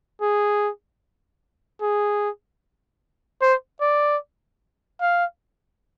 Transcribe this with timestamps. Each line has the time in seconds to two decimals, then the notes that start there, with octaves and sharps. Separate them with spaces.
0.22 G#4
1.81 G#4
3.42 C5
3.81 D5
5.01 F5